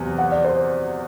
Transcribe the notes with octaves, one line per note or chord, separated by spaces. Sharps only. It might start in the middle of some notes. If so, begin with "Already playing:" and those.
Already playing: E2 C3 F#3 B3
F#5
D5
C5